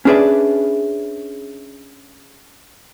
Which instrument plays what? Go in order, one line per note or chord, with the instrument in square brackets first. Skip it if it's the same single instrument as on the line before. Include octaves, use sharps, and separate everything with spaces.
[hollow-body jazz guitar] C#4 D4 G#4 B4 D5 E5